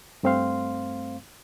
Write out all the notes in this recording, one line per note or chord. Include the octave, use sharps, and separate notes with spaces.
G2 A3 C4 C5 F5 C6